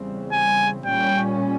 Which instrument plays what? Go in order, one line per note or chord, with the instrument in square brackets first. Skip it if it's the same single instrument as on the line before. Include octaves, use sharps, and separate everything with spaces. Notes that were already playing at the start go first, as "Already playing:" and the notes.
Already playing: [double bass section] E2 C#3 G3 C4
[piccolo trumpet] G#5
[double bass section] A#2 G3 C#4 [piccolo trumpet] G5